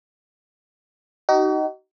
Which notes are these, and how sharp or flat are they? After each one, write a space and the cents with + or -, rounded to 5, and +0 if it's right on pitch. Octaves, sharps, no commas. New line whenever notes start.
D#4 +0 F#4 +45